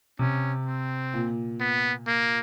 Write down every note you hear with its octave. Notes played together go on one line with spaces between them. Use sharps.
C3 C#4
C4
A#2
B3
A#3